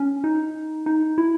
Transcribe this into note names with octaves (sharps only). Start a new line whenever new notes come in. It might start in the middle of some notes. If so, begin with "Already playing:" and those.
Already playing: C#4
D#4
D#4
E4